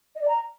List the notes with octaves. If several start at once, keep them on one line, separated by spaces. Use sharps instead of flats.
D#5
D5
A#5